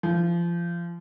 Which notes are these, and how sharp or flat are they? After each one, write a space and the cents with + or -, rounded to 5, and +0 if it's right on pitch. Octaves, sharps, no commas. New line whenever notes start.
F3 -30